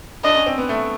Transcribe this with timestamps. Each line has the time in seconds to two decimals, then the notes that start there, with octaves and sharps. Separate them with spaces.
0.24 D4 D#5
0.36 C#4
0.47 C4
0.58 B3
0.69 A3